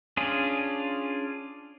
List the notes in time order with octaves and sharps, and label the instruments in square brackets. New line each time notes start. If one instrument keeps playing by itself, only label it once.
[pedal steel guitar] C#4 D4 F4 G#4